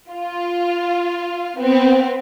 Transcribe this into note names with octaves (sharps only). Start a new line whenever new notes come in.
F4
B3 C4